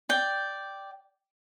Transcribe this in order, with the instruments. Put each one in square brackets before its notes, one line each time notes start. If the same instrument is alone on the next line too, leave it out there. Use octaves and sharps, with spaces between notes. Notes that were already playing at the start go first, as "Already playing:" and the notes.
[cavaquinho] D5 G5